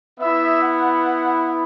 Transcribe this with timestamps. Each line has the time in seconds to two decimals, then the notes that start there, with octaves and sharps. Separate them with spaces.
0.20 B3 E4 E5
0.61 F#5